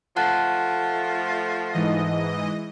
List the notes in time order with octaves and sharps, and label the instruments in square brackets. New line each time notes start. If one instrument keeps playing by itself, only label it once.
[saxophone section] F3 A3 [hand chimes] F#5 A5 F#6
[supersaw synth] G#2 E3 D#5